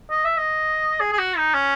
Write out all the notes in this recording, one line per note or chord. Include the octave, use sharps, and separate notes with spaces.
D#5
E5
D#5
G#4
G#4
F#4
D#4
C#4